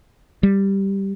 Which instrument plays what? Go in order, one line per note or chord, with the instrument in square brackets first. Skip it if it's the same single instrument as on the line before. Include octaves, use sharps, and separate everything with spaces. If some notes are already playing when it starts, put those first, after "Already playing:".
[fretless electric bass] G3